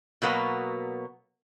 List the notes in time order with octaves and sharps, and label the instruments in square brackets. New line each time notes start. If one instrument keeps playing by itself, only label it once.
[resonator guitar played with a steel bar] B2 F#3 A#3 B3